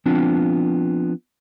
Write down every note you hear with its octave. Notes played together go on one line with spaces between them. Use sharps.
F3 B3 C4 D4 F4